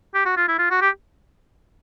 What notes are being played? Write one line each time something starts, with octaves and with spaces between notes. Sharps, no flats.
G4
F#4
F4
E4
F4
F#4
G4